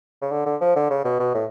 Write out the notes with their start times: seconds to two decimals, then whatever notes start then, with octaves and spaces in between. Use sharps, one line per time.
0.22 C#3
0.31 D3
0.46 D3
0.61 F3
0.76 D3
0.90 C#3
1.05 B2
1.19 B2
1.34 A2